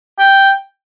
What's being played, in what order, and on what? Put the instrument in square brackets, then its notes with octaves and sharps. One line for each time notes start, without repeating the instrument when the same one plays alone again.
[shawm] G5